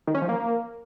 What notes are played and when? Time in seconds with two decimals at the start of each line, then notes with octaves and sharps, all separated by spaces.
0.07 D#3
0.15 C#4
0.22 F3
0.29 A#3